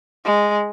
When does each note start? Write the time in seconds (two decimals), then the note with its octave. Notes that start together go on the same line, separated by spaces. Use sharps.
0.25 G#3